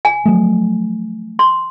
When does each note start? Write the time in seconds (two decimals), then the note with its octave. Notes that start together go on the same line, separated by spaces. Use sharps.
0.05 G#5
0.26 F3 F#3 A3
1.39 C6